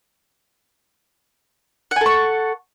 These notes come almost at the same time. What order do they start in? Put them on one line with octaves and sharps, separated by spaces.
F#5 G#5 A4 C#6